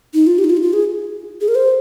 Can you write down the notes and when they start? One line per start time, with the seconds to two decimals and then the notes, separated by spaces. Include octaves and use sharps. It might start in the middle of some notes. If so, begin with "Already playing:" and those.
0.14 D#4
0.27 F4
0.38 G4
0.44 D#4
0.50 F4
0.57 D#4
0.62 F4
0.73 G#4
1.41 G#4
1.48 A#4
1.55 C5